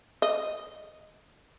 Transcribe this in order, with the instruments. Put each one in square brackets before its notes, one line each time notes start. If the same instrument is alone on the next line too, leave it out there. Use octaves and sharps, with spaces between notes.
[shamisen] D#5